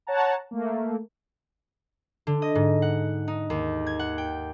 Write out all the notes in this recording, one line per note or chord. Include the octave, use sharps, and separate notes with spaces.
C#5 F#5 A5 A#5
A3 A#3
D3
D#5
G#2
F#5
D#4
D#2
G#6
F#5
G5